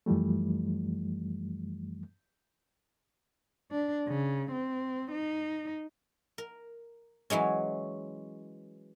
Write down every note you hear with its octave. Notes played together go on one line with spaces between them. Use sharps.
F#2 E3 F3 G3 A3
D4
C#3
C4
D#4
A#4
E3 F#3 G#3 C#4